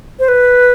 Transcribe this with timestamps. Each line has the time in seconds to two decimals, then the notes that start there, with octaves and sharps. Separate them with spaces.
0.19 C5
0.28 B4